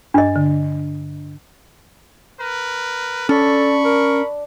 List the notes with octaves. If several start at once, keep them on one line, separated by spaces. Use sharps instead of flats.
G2 D4 D#5
D3
A#4 B4
C#4 D4 A4 B5 C#6
A#4